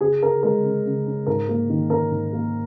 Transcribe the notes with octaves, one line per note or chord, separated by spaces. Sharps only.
C#3 G#4
C#4 A#4
G#3 A#4
C#3
C#3
C#4
G#2 A#4
A#3
D#3
C#4 A#4
G#2
A#3